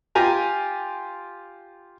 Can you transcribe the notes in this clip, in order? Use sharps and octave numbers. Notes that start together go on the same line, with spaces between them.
F4 G4 G#5 A#5